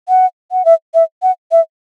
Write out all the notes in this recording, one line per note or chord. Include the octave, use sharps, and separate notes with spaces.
F#5
F#5
E5
E5
F#5
E5